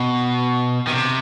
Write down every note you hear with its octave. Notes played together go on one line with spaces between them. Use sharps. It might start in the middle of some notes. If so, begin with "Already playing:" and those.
Already playing: B2
D#3
C3